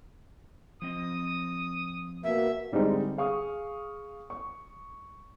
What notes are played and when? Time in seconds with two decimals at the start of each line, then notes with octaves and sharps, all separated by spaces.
0.82 F3 C4 D#5 D#6
2.24 B2 A#3 E5
2.72 D3 G3 G#3 C4 D#4
3.18 G#4 F5 C#6 D#6
4.30 C#6